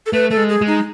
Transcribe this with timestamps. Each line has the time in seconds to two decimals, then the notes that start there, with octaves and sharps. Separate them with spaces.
0.06 A4
0.13 A3 B4
0.30 A3 A4
0.37 G#3
0.49 G#4
0.62 G#3
0.67 D#4